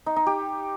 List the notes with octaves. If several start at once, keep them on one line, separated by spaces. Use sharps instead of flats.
D#4
D#4
G4